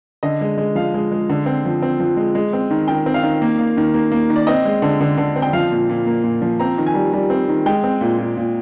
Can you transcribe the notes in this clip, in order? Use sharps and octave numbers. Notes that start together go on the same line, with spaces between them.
D3 D#5
G#3
G#3
F3 F5
G#3
G#3
D3
C4
F3
C4
F3
G#3
G#3
C4
D#3
D#3 G5
C4
F5
D#3
A#3
A#3
D#3
A#3
A#3
D#3
D5
C4 D#5
G#3
D3
D3
D3
C4
G5
F3 F5
A#2
A#2
A#3
A#2
F3
C4 A#5
D#3
G#5
G3
G3
C4
D#3
G#3 G5
C4
A#2
A#2
A#2